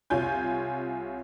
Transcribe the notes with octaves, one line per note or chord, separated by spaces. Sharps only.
C2 F4 C#5 G#5 G6